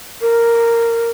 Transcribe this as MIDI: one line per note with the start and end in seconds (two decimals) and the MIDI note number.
0.21 1.10 70